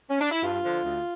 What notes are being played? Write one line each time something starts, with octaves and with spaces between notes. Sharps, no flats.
C#4
D4
E4
G2 F4
D3 F3
D2